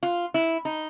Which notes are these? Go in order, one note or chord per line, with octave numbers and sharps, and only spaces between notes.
F4
E4
D#4